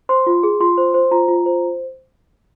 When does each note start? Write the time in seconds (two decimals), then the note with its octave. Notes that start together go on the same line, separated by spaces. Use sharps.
0.09 C5 C6
0.27 F4
0.43 G#4
0.60 F4 C6
0.78 C5
0.94 C5
1.11 F4 A#5
1.28 F4
1.46 C5